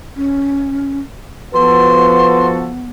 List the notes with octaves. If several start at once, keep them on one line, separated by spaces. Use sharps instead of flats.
C#4
F3 B3 F#4 A4 B4 C6